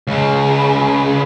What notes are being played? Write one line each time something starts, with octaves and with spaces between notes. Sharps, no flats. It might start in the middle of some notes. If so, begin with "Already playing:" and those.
C#2 C#3